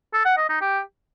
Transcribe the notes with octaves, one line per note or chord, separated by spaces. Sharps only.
A4
F#5
D#5
D#4
G4